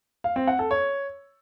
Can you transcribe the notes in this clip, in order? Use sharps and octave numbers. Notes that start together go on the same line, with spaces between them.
F5
C4
F#5
A4
C#5